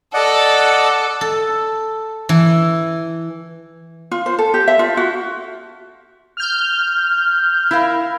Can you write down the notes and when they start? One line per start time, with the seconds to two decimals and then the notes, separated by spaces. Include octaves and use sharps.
0.14 A4 D5 D#5 F#5
1.21 A4
2.29 E3
4.11 F4
4.26 C5
4.39 A4
4.54 G4
4.68 E5
4.79 F4
4.97 F#4
6.37 F6 G6
7.71 E4 A#4 F5